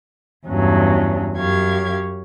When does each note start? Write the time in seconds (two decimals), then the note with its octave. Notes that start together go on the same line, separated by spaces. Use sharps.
0.47 E2 G2 F#3 C#4
1.36 F#2 G4 C#5 F5 G#6